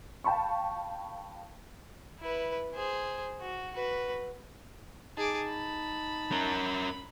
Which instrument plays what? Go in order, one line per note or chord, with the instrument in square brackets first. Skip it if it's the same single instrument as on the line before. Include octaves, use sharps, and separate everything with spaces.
[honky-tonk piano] F5 G5 A5 B5 C#6
[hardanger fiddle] E4 B4
G#4 C5
F#4
F#4 B4
[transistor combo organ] D#4 A5 [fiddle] G#4 D6
[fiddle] B5
[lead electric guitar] C#4 A#4